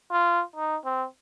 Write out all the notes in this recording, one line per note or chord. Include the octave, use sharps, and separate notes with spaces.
F4
D#4
C4